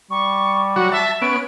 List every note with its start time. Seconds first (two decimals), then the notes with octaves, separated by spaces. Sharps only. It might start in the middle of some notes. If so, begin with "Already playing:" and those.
0.10 G3 C#6
0.76 F#3 F#4
0.92 E5 A5
1.22 B3 C#4 D7